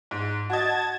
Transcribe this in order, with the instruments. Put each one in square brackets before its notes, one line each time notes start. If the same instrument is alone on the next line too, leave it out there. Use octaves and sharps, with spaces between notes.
[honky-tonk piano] G#2
[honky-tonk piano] F#4 D#5 [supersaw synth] A5 G#6 A6